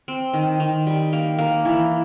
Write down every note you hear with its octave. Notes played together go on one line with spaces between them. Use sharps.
C4
D#3
D#3
G3
A#3
A#3
E3